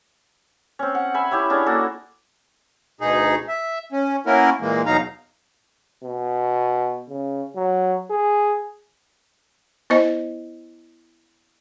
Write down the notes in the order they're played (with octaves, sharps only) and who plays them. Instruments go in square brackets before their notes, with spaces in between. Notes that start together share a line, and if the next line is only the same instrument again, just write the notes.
[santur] C4 C#4
F#5
E5 G#5 B5
E4 G4 C#5 E5
C#4 D4 G#4
A#3 F#4 A4
[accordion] D2 B2 D#4 G#4
E5
C#4
A#3 B3 C#4 E4 F#4 A#4
A#2 E3 G#3 A#3
E2 B2 F#3 D#4 F5 A#5
[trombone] B2
C#3
F#3
G#4
[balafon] B3 E4 C5 D#5